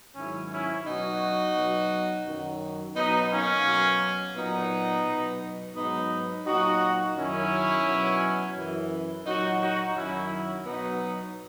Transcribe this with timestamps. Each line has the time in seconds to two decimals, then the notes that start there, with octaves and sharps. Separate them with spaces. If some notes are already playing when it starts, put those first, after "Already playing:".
0.16 G#2 D#3 F#3 C#4 E4
0.51 C#4 E4
0.86 B2 F#3 D#4 F#4
1.56 B2 F#3
2.26 F#2 D#3 F#3
2.96 B2 F#3 B3 D#4
3.31 A#3 C#4
3.66 B2 F#3
4.36 A#2 F#3 B3 D#4
5.06 B2 F#3
5.76 G#2 F#3 B3 D#4
6.46 A#2 F#3 D#4 F#4
7.16 F#2 D#3 F#3 C#4 E4
7.87 B2 F#3
8.56 F#2 E3
9.26 A#2 F#3 D#4 F#4
9.61 D#4 F#4
9.96 F#2 D#3 F#3 C#4 E4
10.66 B2 F#3 B3 D#4